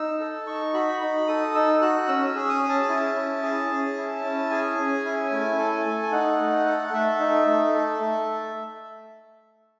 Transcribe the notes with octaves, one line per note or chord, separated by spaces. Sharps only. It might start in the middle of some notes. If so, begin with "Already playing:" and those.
Already playing: D#4 E6
A4
D#4 C#6
F#4 B5
D#4 B5
A4 D#6
D#4 E6
F#4 F#6
C#4 E6
E6
G#4
D#6
C#4
A5
E4 A5
C#4
G#4
C#4
E4
C#4
G#4 G#5
C#4
E4
A3
A4
A3
G#5
D#4 F#5
A3
A4
F#5
A3 E5
D#4
A3
A4
A3